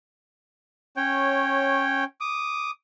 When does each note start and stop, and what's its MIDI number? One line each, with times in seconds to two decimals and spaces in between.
0.97 2.04 61
0.97 2.04 73
0.97 2.04 79
2.21 2.71 86
2.21 2.71 87